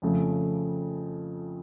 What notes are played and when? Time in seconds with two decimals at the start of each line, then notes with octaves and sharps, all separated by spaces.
0.02 F2 C#3 F3 A3